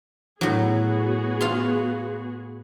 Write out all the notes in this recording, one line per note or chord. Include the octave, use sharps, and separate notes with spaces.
A2 F#3 B3 F#4 G#4
F4 F5 C6